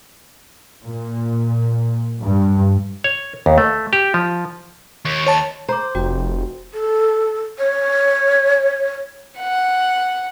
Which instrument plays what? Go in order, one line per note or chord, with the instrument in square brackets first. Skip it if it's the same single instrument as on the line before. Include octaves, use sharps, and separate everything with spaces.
[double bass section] A#2
G2
[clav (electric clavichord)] C#5
D#2
A3
G4
F3
[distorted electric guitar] D#2 [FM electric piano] C#6
[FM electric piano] C#5 A5
[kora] C5 [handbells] A#5 D6
[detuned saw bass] F1 [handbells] F#4 G5
[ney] A4
C#5
[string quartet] F#5